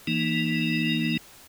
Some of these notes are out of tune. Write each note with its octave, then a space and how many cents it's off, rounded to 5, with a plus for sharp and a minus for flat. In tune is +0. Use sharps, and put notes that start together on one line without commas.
E3 +0 A#3 +0 D#4 -5